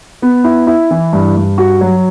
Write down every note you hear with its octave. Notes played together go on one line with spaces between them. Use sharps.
B3
E4
E4
E3
G2
G2
F#4
F#3